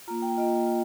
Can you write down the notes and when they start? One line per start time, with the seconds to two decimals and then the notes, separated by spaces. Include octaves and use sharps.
0.08 A#3 F4 A#5
0.22 G5
0.37 A#3 F4 D#5
0.67 F4